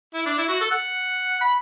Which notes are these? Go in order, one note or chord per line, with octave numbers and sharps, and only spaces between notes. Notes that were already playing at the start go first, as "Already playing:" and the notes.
E4
D4
E4
F#4
A4
F#5
B5